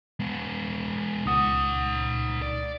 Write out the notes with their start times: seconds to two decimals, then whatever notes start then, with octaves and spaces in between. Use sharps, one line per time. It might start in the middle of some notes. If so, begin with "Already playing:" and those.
0.20 G#3 B3
1.26 C#2 D#4 F#5 D#6
2.42 D5